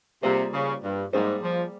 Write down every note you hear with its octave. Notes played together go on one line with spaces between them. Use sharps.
C3 G3 A#3 F4 G#4 C5
C#3
G2
G#2 G3 A#3 F4 G#4 C5
F3